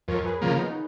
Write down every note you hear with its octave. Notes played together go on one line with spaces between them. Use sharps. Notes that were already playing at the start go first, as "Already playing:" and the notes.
F2 A#4 C#5
G#4 B4
C#3 F3 A#3
B3 D#4